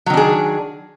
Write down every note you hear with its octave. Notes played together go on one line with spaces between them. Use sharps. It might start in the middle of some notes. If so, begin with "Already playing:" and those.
D#3 F#3 D4 G#4